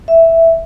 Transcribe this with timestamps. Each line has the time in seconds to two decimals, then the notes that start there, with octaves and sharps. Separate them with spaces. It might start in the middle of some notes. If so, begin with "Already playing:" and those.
0.08 E5